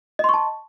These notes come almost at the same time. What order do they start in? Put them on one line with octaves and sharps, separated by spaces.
D#5 C6 C#6 A5